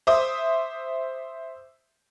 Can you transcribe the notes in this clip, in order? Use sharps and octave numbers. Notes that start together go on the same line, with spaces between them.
C5 E5 D6 D#6